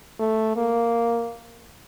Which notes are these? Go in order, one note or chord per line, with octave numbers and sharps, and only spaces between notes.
A3
A#3